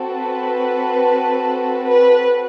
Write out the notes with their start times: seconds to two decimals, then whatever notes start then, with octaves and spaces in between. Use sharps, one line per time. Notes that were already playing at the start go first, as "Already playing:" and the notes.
Already playing: C4 F#4 A4
0.11 B4
1.85 B4